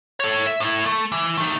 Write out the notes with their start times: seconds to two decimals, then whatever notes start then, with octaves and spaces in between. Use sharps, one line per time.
0.20 A4 C#5
0.46 E5
0.60 A2 E4
0.86 A3
1.12 E3
1.38 A3 D#4